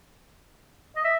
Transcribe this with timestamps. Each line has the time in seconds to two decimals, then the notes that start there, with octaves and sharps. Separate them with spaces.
0.96 D#5
1.04 E5